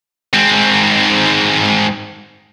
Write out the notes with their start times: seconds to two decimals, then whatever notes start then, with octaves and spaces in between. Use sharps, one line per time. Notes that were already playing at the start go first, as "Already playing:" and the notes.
0.34 G#2 C4